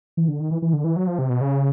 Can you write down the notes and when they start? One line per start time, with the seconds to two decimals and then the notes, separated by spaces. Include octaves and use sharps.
0.17 E3
0.28 D3
0.40 D#3
0.51 E3
0.62 E3
0.73 D3
0.84 E3
0.96 F#3
1.07 F3
1.19 C3
1.30 B2
1.41 C#3